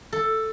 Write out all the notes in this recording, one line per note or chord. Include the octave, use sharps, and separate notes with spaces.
A4